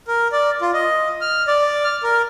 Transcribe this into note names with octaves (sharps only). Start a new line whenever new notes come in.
A#4
D5
F4
D#5
F6
D5
F6
A#4